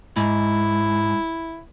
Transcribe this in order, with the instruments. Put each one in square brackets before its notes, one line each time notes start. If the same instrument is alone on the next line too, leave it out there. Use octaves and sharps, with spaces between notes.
[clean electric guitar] G#2 [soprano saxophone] E4